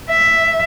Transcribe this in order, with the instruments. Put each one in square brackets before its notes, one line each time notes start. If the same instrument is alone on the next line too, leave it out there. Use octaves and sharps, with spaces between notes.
[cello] E5